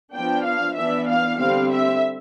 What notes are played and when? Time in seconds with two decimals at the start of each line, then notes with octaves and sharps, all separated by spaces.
0.12 F3 B3 D4 G5
0.44 F5
0.76 E3 B3 D4 E5
1.08 F5
1.38 D3 G3 C4 F5
1.70 E5